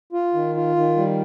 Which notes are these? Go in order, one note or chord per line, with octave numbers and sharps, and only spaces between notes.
F4
D#3
F4
D#3
G3